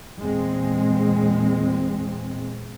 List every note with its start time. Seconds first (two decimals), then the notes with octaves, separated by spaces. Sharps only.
0.19 E2 A#2 G#3 C4